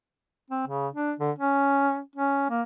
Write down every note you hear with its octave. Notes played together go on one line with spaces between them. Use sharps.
C4
C#3
D4
D3
C#4
C#4
A#3